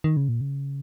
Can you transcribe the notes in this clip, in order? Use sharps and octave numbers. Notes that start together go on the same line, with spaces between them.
D#3
C#3
A#2
C#3